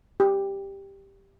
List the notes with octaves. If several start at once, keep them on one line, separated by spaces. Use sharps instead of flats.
G4